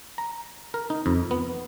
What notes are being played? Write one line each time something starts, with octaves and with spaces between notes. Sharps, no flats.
A#5
A#4
D#4
F2
B3